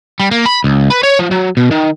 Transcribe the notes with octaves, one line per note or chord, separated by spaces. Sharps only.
G3
A#3
B5
C#2
B4
C#5
F3
F#3
B2
D#3